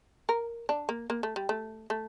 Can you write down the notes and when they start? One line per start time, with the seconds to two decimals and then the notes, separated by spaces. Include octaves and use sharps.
0.29 A#4
0.69 D4
0.89 A#3
1.10 A#3
1.23 A3
1.36 G3
1.49 A3
1.90 A3